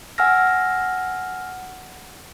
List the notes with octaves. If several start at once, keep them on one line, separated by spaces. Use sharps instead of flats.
F#5 G#5 E6 F6 A#6